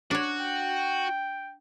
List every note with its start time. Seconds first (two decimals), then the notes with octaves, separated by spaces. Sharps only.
0.11 D4 F#4 C#5
0.41 G5